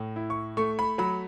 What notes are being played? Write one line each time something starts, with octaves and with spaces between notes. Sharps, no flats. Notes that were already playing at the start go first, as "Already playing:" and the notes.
Already playing: A2
E4
C#6
A3 C#6
B5
F#3 B5